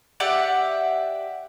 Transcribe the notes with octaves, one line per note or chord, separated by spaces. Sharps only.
G4 D5 E5 F#5